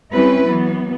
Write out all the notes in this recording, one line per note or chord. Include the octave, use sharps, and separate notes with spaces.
G3 C4 C#4 E4 B4
E3 F#3 B3